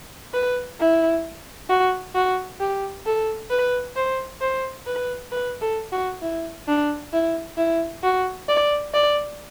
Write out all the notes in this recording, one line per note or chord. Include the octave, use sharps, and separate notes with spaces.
B4
E4
F#4
F#4
G4
A4
B4
C5
C5
B4
B4
A4
F#4
E4
D4
E4
E4
F#4
D5
D5